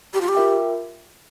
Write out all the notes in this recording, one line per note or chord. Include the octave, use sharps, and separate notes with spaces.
G4
F4
G4
F4 A#4 E5 G5